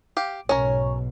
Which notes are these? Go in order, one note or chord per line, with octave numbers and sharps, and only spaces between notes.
G4 F5
B1 G#2 B2 C#4 A#4 C#5